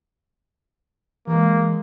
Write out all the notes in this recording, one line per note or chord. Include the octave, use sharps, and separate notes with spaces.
E3 G#3 A#3